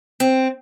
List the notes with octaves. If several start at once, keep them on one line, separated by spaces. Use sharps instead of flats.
C4